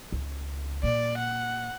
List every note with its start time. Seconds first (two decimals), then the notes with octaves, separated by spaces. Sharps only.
0.12 C#2
0.83 A#2 D5
1.17 F#5